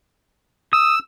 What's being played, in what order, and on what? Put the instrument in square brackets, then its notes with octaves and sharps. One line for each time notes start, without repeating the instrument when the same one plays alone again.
[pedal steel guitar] D#6 [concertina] E6